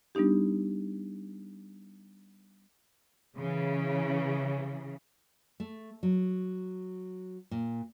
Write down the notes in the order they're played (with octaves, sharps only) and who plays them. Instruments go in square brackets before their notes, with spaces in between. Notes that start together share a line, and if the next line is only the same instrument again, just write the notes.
[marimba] G3 B3 D4 D#4 G4
[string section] C#3 E3
[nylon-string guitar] A3
F#3
A#2